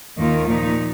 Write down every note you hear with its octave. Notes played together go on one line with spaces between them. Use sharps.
D#2 D#3 A#3 F4
A#2 F3 A#3 D#4